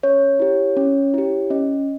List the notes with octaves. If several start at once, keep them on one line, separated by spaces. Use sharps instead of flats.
C#4 C#5
E4 G4
C#4
E4 G4
C#4 D#5